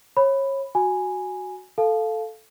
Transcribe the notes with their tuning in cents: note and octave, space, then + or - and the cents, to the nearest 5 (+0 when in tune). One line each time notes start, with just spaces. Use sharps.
C#5 -30 B5 +5
F#4 +0 G#5 +0 B5 +0
A4 +0 F5 +0 A5 -25